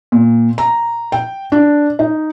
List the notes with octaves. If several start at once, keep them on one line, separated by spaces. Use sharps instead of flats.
A#2
A#5
G5
D4
D#4